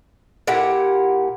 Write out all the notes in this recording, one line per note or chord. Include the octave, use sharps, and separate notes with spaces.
A#2 E4 G4 F#5